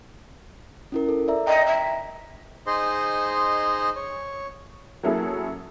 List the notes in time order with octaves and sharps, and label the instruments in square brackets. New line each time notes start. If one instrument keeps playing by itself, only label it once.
[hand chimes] C#4 E4 A#4
A4
D5 E5 A#5
[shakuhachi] D#5 [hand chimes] G5 A#5
[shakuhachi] E5
[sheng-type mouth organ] D#4 G#4 C5 D#5 C6
C#5
[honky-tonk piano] F#3 A#3 C#4 E4 G#4 A4